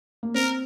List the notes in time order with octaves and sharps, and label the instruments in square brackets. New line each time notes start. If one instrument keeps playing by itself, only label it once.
[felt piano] A#3
[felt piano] C4 [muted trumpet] A#4